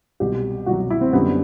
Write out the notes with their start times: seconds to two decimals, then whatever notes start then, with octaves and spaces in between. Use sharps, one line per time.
0.20 C2 B2 F#3 G4
0.66 C2 B2 F#3 F#4
0.90 E4
1.01 C4
1.13 F#2 D3 G3 B3